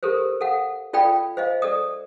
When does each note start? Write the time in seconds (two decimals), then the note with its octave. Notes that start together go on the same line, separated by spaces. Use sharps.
0.03 G4 A4 A#4 C5
0.41 A4 F5 F#5
0.93 F4 A4 D5 F5 G5 B5
1.37 C5 D#5 F5
1.62 A4 D5 D#6